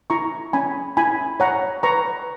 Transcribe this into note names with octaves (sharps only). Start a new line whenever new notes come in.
E4 A#5 C#6
C#4 G#5 B5
E4 G#5 B5
C#5 F#5 A#5
B4 A#5 C#6